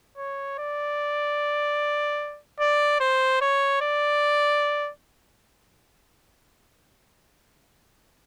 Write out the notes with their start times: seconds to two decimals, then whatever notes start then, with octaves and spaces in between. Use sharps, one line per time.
0.18 C#5
0.58 D5
2.60 D5
3.00 C5
3.41 C#5
3.81 D5